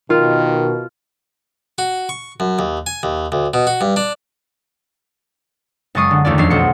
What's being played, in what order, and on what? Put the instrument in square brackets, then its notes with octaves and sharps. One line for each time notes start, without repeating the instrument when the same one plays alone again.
[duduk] B2 [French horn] D#3 [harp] F4 [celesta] A#4
[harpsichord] F#4
C#6
F#2
D#2
G#5
D#2
D2
B2
F#4
G2
D4
[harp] F#1 G#3 A5 C#6 D#6 C7
D3
D#2 A3 C#4 F4 D5
E1 F2 C#4 D4 C7
B1 C5 C#7